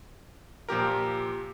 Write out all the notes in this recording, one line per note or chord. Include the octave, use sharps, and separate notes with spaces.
A#2 F3 G4 A#4